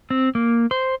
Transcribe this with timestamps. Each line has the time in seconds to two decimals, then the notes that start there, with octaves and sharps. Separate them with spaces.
0.10 C4
0.35 A#3
0.71 C5